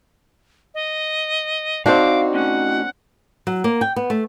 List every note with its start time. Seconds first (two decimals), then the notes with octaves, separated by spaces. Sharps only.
0.74 D#5
1.86 C4 D4 D#4 F#4 F5 D6
2.34 A2 C#4 F#5
3.47 F#3
3.64 A#3
3.81 G5
3.96 B3
4.10 A3